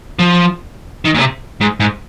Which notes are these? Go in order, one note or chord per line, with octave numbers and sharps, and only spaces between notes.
F3
D#3
A#2
C3
G#2
G#2